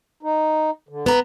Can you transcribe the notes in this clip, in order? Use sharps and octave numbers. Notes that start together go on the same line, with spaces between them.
D#4
D3
B3 A#5